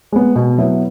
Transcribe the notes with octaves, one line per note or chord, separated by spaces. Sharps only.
G#3 B3
B2
F#3 B3 E4